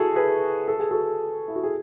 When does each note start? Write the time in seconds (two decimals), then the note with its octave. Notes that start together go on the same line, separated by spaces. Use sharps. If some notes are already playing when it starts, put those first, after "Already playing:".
Already playing: E4 F#4 G#4 A4
0.16 G#4 B4
0.68 A4
0.79 G#4
0.91 F#4 A4
1.48 E4
1.56 F#4
1.64 G#4